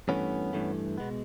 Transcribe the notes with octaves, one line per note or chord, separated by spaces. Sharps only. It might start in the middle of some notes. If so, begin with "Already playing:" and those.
G2 E3 A3 B3 C#4
G2 E3 A3
B2 G#3 B3